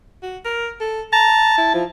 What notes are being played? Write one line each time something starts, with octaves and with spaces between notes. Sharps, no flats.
F#4
A#4
A4
A5 A#5
E4
F3